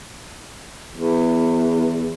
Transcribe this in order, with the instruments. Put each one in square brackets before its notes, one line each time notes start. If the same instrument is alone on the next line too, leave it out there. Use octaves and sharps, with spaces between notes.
[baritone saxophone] E2